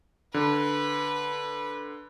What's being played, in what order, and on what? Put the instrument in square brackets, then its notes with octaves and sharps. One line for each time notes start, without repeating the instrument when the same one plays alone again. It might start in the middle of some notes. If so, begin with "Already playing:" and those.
[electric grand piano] D3 [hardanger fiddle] B4